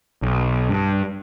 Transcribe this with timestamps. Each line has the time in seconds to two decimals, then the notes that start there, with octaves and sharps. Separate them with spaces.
0.22 B1
0.69 G2